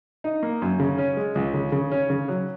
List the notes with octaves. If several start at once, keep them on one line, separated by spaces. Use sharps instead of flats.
D#4
A#3
F#2
C#3
C#4
G#3
C#2
C#3
C#3
C#4
C#3
F#3